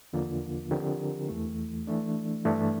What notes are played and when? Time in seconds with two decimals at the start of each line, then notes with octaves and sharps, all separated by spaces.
0.13 E2 D3 F3 A#3 F4
0.71 D3 F3 C4 G4 A#4
1.29 E2 E3 A3
1.87 E3 A3 D4
2.45 G2 E3 A3 D4